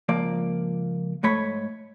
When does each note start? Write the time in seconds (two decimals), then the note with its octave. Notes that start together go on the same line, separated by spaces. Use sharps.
0.09 C#2 F3 A#3 D5
1.23 G#2 A3 C#5 B5